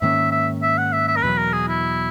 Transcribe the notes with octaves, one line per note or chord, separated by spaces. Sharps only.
G#2 D#3 A#3 C#4 E5
E5
E5
F#5
E5
E5
A#4
E2 B2 F#3 B4
A#4
G#4
E4